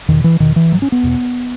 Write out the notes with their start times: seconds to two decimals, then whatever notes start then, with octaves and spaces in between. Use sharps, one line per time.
0.08 E2 B2 D#3
0.24 E3
0.40 E2 B2 D#3
0.56 E3
0.72 G#2 F#3
0.82 C#4
0.92 B3
1.03 E2 B2